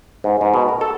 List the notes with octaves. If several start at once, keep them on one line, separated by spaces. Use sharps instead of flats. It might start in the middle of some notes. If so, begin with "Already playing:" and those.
G#2
G#2
B2
A#4
A4